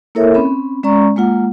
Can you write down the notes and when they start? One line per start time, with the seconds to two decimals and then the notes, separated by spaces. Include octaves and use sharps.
0.15 A#3 E4 A4 A#4 C#5 E5
0.34 C4 C#4 B5
0.83 G#3 C#4 D5 A#5 C#6
1.16 G#3 A#3 F4 F#5